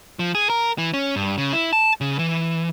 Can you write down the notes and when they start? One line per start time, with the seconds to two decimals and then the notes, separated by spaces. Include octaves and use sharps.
0.19 F3
0.35 G#4
0.50 A#4
0.78 E3
0.94 C#4
1.16 G2
1.38 C#3
1.53 E4
1.73 A5
2.01 C#3
2.19 E3